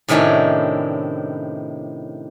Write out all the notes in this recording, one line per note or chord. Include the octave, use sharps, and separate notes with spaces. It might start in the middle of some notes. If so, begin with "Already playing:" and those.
A2 C3 D#3 C#4 D4 E4